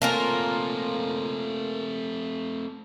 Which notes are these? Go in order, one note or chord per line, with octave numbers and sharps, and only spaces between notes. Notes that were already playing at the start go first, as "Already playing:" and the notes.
A3 A#3 C4 F4 A#4 C#5 G#5 A5